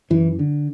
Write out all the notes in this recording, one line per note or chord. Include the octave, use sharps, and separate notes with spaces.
F#2 E3
D3